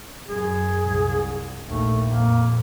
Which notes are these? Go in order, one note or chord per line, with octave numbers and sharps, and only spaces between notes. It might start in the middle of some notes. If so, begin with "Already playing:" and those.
F#2 G#4
C2
A#1 D#2 A3
F2 A#2 A#3